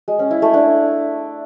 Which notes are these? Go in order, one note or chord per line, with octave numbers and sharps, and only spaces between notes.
G#3
C#4
E4
A3
D4